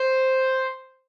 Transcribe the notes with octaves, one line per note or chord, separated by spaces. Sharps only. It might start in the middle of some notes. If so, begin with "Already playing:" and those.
Already playing: C5